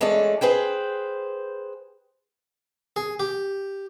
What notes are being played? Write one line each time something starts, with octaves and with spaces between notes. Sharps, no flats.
E3 G#3 A3 C#4 D5 A5
G#4 B4 C5 G5
G#4
G4